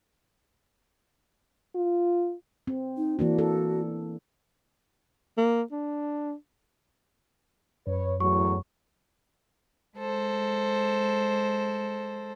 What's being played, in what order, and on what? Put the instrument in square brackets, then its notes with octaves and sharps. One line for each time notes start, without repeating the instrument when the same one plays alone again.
[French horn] F4
[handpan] C4
[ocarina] D#4
[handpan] E3 A#3 D4 [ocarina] F#4
[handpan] A4
[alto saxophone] A#3
D4
[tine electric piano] F#2 [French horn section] B4 C#5
[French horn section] E2 A2 F#3 [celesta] C#6
[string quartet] G#3 A4 C5